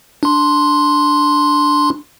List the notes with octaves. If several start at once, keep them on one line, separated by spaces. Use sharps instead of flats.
D4 C6